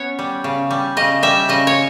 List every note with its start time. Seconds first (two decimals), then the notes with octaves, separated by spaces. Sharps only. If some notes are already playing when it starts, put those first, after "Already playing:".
Already playing: B3 C#4 C#5
0.19 G3
0.44 C#3
0.70 G3
0.97 C#3 D#5
1.23 G3 E5
1.49 C#3 D#5
1.67 C#5